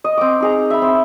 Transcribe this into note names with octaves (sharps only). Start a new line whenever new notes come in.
D#5
C4 D6
D#4 G#4 A#5
E5 B5
C4